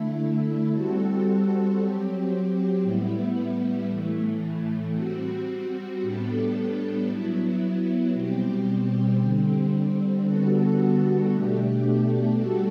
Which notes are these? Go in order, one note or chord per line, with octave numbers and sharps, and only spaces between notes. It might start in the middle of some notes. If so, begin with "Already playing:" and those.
Already playing: D3 A3 E4
G3 C4 F#4 A4
F#3 C4 G4
A2 G3 B3 E4
A2 E3 A3
G3 C4 F#4
A2 G3 B3 D4 A4
F#3 B3 E4
B2 G3 C4 G4
D3 G3 C4
D3 G3 B3 F#4 A4
B2 A3 D4 G4
G3 D4 F#4 A4